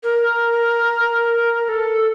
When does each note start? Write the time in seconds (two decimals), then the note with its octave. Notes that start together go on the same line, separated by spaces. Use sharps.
0.04 A#4
1.64 A#4
1.69 A4